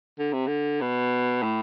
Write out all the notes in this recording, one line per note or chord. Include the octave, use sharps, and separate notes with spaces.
D3
C3
D3
B2
A2